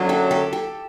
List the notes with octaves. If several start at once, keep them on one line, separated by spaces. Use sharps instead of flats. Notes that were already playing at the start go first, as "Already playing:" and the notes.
Already playing: F#2 D3 F#3 F4
G4 A4
G4 A4
G4 A4